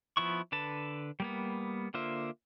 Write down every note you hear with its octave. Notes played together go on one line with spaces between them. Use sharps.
F3 B3 E4 C#6
D3 B4 A5
G3 A#3 B3
D3 A#3 F4 C5 E5